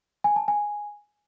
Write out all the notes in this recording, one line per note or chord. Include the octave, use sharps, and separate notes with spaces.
G#5
A5
G#5